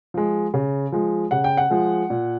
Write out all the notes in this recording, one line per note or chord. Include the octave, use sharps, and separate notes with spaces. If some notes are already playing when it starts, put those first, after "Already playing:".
F3 G#3
C#3
F3 G#3
C#3 F#5
G5
F#5
F3 G#3
A#2